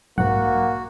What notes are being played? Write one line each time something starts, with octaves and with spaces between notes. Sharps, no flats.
B1 G#2 A#3 F#4 F#5